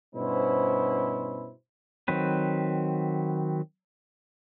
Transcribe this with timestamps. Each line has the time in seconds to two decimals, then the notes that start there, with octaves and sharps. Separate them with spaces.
0.15 G2 B2 C#4 E4 C5
2.08 D#3 F#3 C4 B4